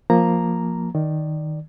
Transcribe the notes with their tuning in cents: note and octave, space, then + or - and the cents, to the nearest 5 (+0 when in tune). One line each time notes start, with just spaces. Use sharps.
F3 +0 A#3 +0 A#5 +0
D#3 +0 D5 +0